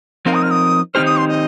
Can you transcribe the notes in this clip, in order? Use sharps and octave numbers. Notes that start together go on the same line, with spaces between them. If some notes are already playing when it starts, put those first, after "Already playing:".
F3 C4 D#4 A#4 F5
D#6
F6
D#6
D#3 C4 D#4 G4 C5 F6
D#6
C6
D#5